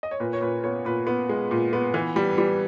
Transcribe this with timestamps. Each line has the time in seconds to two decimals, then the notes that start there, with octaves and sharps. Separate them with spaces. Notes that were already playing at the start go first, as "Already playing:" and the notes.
0.03 D#5
0.11 C#5
0.20 A#2 B4
0.33 C#5
0.41 A#2 B4
0.64 B3 C#5
0.85 A#2 B4
1.07 B3
1.29 G#3
1.51 A#2
1.73 B3
1.94 E3
2.16 G3
2.38 G3